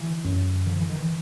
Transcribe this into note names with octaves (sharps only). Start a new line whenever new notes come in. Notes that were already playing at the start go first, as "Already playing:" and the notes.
Already playing: D3 E3
F#2
D3 F3
E3
D#3
E3